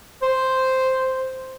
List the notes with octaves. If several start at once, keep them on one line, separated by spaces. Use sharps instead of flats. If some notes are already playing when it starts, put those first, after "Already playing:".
C5